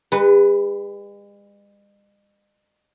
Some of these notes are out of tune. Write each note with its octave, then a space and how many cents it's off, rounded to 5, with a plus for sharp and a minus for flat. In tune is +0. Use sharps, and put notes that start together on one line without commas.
G#3 -45 B4 +0